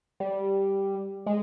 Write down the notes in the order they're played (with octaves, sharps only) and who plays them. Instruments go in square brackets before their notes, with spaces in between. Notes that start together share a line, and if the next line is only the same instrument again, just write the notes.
[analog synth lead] G3
G#3